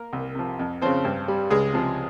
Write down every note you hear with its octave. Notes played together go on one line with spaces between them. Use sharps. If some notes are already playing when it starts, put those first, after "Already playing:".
Already playing: A#3 A#4
C2
C3 F3
F2
C#3 F3 C4 C5
G2
G3
C#2 G#3 G#4
C3 F3